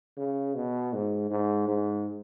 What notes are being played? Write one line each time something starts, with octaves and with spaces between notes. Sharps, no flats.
C#3
B2
G#2
G#2
G#2